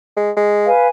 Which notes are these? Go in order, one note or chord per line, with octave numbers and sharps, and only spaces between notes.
G#3
G#3
B4 F5 G#5